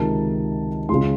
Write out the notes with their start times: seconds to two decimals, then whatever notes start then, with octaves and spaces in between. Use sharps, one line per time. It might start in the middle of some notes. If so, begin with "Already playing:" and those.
Already playing: C#2 C3 D#3 A5
0.89 C#2 C#3 C6